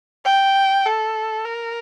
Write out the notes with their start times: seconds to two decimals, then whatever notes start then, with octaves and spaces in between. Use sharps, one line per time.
0.25 G5
0.86 A4
1.45 A#4